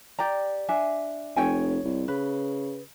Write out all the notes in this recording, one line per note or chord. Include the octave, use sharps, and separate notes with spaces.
G4 D5 A#5
D4 E5 G#5
F1 C#5 G5 G#5
C2
C#3 B4